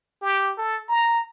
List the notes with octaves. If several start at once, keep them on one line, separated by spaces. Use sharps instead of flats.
G4
A4
A#5